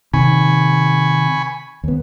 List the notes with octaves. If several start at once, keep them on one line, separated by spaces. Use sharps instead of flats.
C3 D#3 G#5 B5 C#6
D#2 B3